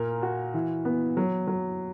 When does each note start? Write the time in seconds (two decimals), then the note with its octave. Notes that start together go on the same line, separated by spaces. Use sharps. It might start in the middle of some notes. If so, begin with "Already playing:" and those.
Already playing: A#2 A#4
0.23 F#4
0.54 E3
0.85 B3
1.17 F#3
1.47 F#3